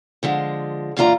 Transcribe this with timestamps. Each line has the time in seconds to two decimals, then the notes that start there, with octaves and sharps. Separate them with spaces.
0.23 D3 F3 G#3
0.97 F#2 A#2 E3 F4 D5 A#5